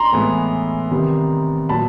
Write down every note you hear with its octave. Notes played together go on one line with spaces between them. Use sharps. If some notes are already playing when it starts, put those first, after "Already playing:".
Already playing: A#5 C6
A2 E3 G#3 B3
C3 D#3 G3 B3
A#2 F#3 B3 A5 B5